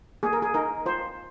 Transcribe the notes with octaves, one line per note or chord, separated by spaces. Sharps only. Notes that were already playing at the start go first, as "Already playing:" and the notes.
A#3 G#4
A#4
G#4
D#4 A#4
F4 C5